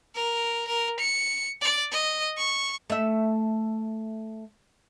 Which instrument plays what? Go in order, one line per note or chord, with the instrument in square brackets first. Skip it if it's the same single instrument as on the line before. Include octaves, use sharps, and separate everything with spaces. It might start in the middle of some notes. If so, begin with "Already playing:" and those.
[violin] A#4
A#4
C#7
D5
D#5
C#6
[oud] A3 E5